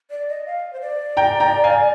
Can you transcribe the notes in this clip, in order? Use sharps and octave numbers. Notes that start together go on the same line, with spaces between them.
D5
D#5
F5
C5
D5
G5 A#5
G5 A#5
F5 G#5